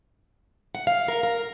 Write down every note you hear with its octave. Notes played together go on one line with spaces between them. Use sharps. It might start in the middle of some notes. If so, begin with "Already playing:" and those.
F#5
F5
A#4
A#4